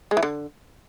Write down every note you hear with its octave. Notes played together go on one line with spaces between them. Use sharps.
G#3
E3
D3